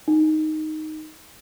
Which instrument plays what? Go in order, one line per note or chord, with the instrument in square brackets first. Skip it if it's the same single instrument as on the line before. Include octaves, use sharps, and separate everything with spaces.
[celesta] D#4